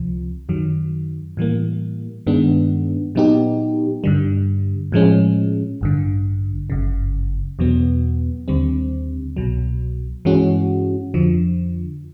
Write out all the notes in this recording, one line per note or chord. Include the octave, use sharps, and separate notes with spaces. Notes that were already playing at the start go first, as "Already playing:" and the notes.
Already playing: C#2 C3 F3
F#2 D#3 F#3
A2 E3 G3 A#3
G2 D#3 G#3 B3 D4
A#2 F#3 B3 D#4 G4
G2 D3 G3
A2 F3 G#3 C#4
A1 G2 D3
G1 F#2 C#3
E2 B2 F#3 B3
D#2 D3 G3 C4
C2 B2 F#3
G2 E3 G#3 C#4 F#4
F2 D3 F3